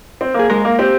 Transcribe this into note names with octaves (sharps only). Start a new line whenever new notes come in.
C4
A#3 G#4
G#3 A#4
A#3
C4 G4